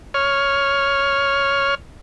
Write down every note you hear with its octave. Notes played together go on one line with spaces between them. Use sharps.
C#5 F6